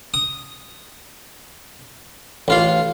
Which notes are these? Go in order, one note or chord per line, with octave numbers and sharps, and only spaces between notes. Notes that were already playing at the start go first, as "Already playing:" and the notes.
D#6
A1 F4 F5